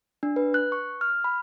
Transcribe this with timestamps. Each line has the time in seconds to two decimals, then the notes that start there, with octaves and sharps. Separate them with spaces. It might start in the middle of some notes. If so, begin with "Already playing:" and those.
0.23 D4
0.36 B4
0.54 F#6
0.72 C#6
1.01 F6
1.24 B5